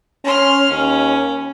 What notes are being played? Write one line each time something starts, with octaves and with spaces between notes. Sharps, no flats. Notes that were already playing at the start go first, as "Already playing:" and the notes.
C#4 C6 F6
D#2 C#4